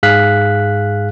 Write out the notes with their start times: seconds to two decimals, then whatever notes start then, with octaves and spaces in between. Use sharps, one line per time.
0.03 G#2 G#4 F5 F#6 B6